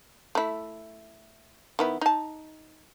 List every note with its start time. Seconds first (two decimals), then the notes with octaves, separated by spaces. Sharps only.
0.35 A3 E4
1.79 D#3 B3 E4
2.01 D#4 A5